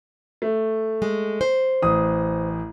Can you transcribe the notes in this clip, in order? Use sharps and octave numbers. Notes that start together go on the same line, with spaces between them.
A3
G#3
C5
A1 D#6